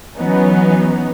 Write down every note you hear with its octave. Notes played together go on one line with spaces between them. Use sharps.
E3 F#3 B3 C#4 D#4